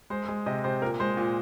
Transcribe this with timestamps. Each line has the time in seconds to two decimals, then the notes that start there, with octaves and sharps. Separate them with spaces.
0.10 G#3 C5
0.28 G#3
0.46 C3 D#5
0.64 C3 C5
0.82 A#2 A#4
1.00 G#3 C5
1.17 A#2